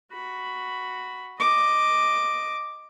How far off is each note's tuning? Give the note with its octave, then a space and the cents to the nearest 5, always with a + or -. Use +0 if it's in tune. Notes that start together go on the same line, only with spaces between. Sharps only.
F#4 +0 B5 +5
D#5 +0 D6 +5